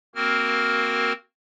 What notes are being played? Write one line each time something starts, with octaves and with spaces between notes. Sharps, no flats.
A#3 C4 F#4 A#4 F6